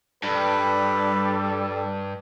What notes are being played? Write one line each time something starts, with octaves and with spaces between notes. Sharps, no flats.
G2 G3 A4 B4